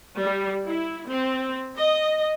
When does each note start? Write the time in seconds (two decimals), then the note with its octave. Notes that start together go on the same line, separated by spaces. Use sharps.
0.20 G3
0.65 E4
1.07 C4
1.75 D#5